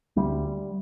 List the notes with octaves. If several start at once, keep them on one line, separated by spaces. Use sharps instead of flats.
D2 G3